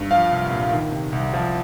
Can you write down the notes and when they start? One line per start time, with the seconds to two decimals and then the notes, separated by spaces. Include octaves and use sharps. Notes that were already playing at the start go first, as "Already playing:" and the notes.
Already playing: G2
0.11 F3 F5
0.31 C2
0.52 A#2
0.72 D#3
0.92 C3
1.13 C2
1.33 F3